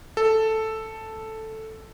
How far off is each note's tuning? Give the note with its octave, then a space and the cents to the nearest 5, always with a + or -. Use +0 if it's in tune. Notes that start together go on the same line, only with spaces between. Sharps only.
A4 +0